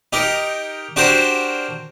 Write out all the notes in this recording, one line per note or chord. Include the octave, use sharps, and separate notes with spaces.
D#4 G4 A#4
D4 F#4 G4 A#4 C5